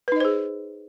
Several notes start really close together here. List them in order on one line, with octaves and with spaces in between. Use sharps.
B4 D#4 D#5 C5 G#4